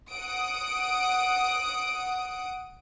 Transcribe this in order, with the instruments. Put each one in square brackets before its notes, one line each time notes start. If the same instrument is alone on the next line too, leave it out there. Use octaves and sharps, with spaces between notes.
[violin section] F#5 D#6 D7